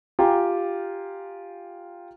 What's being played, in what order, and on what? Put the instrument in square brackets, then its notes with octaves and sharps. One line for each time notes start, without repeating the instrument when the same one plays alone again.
[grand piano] F4 G4 G5 G#5 A#5